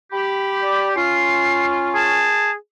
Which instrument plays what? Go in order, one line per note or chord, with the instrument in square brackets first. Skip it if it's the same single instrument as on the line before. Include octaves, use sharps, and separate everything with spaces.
[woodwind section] G4 [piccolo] B5
[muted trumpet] D5
[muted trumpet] C#4 [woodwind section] F4 [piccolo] C7
[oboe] G#4 [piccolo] A5